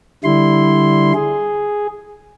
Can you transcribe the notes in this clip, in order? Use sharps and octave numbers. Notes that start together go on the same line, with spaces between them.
D3 G3 E4 C6
G#4